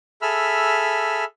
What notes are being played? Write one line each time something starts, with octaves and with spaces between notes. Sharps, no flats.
G#4 A4 E5 B5 E6 F6